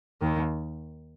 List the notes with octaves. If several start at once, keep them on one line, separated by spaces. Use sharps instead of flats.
D#2 D#3